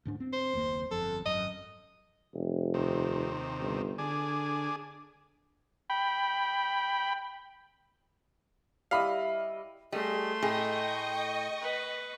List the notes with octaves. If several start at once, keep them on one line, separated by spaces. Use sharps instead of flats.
D2 G#2 D4
C4
C5
F#1 D#2 A#3
G1 F2 A4
G#1 F#2 D#5
F1
D#2 C3
G1
D3 D4 G#4
G5 B5
G3 E4 D#5 F5 B5
G3 A3 G#4 D#5 C6
A2 G#4 D#5 G5 C#6
B4